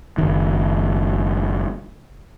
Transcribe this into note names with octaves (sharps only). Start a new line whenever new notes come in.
F#1 D#3